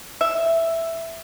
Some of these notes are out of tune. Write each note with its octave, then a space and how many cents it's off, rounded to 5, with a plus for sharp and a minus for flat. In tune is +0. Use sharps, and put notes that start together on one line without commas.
E5 +5